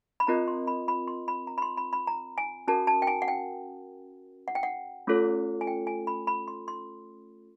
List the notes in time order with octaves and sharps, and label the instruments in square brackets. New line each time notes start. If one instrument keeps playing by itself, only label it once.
[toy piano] B5
[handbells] C4 F4 A#4 D#5 [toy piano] A#5
[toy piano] C6
B5
B5
C6
B5
A#5
B5
C6
B5
B5
A#5
G#5
[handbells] C#4 F#4 A#4 [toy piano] A5
[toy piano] A5
G5
G#5
F#5
G5
F#5
G5
F#5
[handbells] A3 C#4 F4 A4 C#5
[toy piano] G#5
G5
G#5
B5
B5
C6
C6